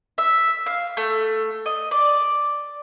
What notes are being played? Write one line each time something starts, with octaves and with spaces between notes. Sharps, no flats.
E5
F5
A3
D#5
D5